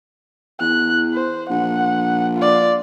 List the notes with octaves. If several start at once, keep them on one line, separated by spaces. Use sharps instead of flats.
E2 F#6
C5
A#1 F#5
F4 D5